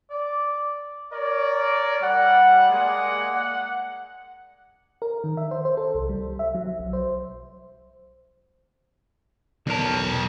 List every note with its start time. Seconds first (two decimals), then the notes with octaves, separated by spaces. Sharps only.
0.10 D5
1.13 A#4 C#5 D5
2.02 G3 F#5
2.70 G#3 A#3 G#4 D5 F#5
3.34 F#5
5.02 A#4
5.24 D#3
5.37 E5
5.51 C5
5.65 C5
5.77 A4
5.95 C2
6.09 G3
6.39 E5
6.55 F#3
6.79 B1
6.93 C5
9.67 B1 E2 A#4 A5